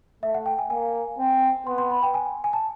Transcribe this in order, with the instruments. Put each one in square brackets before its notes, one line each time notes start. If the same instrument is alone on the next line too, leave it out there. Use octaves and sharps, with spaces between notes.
[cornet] A3 [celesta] E5
[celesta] F#5
G5
G#5
[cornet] A#3 [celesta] G#5
[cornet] C4
[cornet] B3 [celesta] C6
[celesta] C6
B5
G5
G#5
G#5
A5